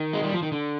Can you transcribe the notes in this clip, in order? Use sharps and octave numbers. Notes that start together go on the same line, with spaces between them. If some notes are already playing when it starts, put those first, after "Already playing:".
Already playing: D#3
G#3
G3
F3
D#3
D3